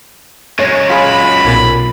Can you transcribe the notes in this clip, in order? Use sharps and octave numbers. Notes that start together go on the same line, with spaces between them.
F#2 G#3 C#5
F4 G#4 B5
B1 A#2 A6